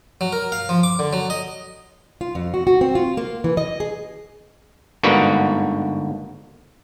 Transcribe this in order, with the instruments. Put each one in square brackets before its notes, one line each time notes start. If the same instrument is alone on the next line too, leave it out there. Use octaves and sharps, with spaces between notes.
[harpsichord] F#3
A#4
F5
F3
D6
D3
F#3
D#5
[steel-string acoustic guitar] F4
F2
F#4
F#4
C4
F4
A#3
E3
D#5
G#4
[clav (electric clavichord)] G1 G#2 D3 A#3 F#4 B4